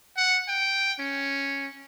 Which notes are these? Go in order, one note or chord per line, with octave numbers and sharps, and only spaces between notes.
F#5
G5
C#4